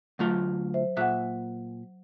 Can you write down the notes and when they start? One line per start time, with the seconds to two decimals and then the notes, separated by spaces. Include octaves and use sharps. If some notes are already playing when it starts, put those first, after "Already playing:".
0.19 D2 F#3 A3 F4
0.74 C5 E5
0.97 A#2 E5 F#5 F#6